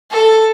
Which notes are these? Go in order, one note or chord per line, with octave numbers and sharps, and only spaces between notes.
A4